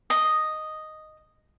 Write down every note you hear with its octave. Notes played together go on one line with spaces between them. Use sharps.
D#5